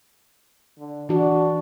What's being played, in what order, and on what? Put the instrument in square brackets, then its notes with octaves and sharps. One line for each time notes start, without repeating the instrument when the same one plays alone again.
[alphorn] D3
[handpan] E3 F#4 [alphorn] D4